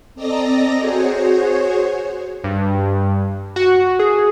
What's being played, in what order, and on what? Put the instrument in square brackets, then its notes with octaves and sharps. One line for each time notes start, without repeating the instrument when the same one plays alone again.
[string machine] C4 A4 D5 D#5 A#5 A#6
F#4 G#4 C5 C#5
[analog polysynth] G2
F#4
G#4